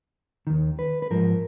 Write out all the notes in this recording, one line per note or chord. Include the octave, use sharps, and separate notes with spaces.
D#2 D#3
B4
B4
G#2 F3 A#4